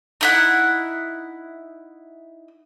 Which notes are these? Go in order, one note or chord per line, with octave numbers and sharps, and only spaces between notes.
D#4 E4 F#5